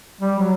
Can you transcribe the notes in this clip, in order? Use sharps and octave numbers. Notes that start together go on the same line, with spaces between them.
G3
F#3